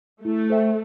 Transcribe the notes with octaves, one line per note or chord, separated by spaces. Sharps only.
A3 E4
A4 C5 E5 G5